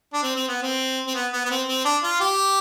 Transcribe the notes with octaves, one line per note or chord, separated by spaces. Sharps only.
D4
C4
C4
B3
C4
C4
B3
B3
B3
C4
C4
D4
F4
G4